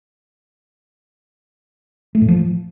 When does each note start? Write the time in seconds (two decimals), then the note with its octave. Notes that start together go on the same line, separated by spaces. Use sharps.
2.15 A3
2.22 A2
2.29 F3